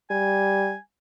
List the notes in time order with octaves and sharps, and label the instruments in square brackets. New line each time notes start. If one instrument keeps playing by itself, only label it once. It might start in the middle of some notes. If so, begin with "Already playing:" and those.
[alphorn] G3 [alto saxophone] G#5